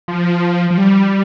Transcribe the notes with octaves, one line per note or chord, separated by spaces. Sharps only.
F3
F3
G3